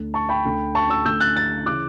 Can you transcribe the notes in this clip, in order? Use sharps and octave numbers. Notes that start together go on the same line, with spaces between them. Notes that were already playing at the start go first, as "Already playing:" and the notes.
Already playing: D2 D3
A5 C#6
G5 B5
D2 D3
A5 C#6
C#6 E6
D2 D3 E6 G6
F#6 A6
F#6 A6
C#3 E3 D6 F#6